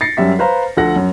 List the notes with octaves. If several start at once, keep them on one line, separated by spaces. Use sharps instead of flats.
A6 A#6 C7 C#7
F#2 G3 E5 B6
B4 C5 F5 A#5
D2 F3 A4 F#5 A#6
F#2